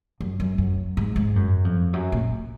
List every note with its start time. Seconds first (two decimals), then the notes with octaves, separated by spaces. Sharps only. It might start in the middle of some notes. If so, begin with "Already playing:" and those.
0.20 F#2
0.40 F#2
0.58 F#2
0.97 G#2
1.16 G#2
1.36 F#2
1.65 F2
1.93 F#2
2.12 A#2